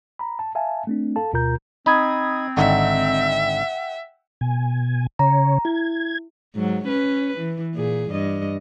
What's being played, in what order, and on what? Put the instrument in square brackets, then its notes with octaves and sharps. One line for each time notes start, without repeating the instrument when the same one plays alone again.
[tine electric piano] A#5 B5
A5
E5 F5 G#5 A5
A3 C4 D4
A4 F5 A5
D2 B2 F4 A#4 A#5 G6
[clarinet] C4 [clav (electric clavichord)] D#4 [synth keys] B5 D#6 G#6
[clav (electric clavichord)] G#1 D3 D#4 [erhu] E5 [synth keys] F#5 G5
[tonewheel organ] B2 G#5
[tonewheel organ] C#3 C#5 [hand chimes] A#5
[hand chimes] E4 [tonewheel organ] G#6
[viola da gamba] G#2 F#3
C#4 B4
E3
A#2 G#4
G2 D#5